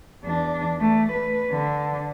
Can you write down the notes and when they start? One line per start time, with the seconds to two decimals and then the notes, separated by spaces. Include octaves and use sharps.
0.23 E2 D4
0.80 A3
1.12 B4
1.51 D3